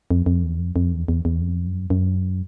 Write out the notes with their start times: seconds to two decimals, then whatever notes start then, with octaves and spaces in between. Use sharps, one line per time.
0.11 F2
0.26 F2
0.43 E2
0.59 F2
0.76 F2
0.92 E2
1.08 E2
1.25 E2
1.41 F2
1.66 F#2
1.90 F#2